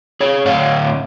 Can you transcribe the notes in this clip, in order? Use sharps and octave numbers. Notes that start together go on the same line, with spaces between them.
G#4 C#5
A2 D3 D5 F5 F#5